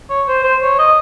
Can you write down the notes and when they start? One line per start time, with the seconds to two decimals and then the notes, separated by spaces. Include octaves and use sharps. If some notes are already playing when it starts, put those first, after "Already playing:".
0.10 C#5
0.28 C5
0.44 C5
0.62 C#5
0.79 D#5